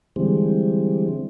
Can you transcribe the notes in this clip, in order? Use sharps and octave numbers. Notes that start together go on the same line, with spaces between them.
D3 E3 G3 G#3 C4